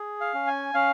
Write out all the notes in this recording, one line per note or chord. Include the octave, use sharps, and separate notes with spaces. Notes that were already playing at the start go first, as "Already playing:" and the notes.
Already playing: G#4
F5
C#4
G#5
C#4 F5